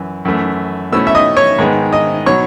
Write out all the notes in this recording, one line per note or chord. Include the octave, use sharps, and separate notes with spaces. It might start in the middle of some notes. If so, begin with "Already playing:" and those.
Already playing: F#2 E3
F#2 E3 A3
B2 A3 C#4 E4 E6
E5 E6
D#5 D#6
C#5 C#6
G#2 D#3 G#3 B3
D#5 D#6
B2 F#3 C#5 C#6